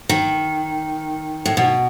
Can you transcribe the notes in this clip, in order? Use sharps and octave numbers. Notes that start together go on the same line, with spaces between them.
D#3
A2
B2